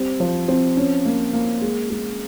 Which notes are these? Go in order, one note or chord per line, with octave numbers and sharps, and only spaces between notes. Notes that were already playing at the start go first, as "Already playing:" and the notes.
Already playing: G3 C4
F3
C4
C#4
A#3
A#3
G#3
G#3